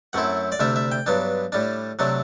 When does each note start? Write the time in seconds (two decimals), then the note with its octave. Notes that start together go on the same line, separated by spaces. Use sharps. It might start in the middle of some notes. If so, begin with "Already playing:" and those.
0.13 F#2 F#3 A3 C4 E4 F#5
0.52 D5
0.59 D2 C3 G3 D4 E5
0.76 E5
0.92 G5
1.06 G2 F#3 B3 D4
1.52 A2 G3 D4
1.99 C3 F#3 A3 D4